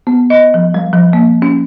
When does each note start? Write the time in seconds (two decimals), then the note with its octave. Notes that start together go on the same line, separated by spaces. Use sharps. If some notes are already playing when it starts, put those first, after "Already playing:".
0.07 B3
0.30 D#5
0.54 F3
0.74 G3
0.93 F3
1.13 A#3
1.42 C#4